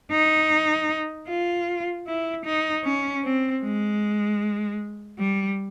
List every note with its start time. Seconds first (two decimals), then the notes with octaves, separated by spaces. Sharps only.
0.12 D#4
1.28 F4
2.07 E4
2.46 D#4
2.85 C#4
3.24 C4
3.63 G#3
5.19 G3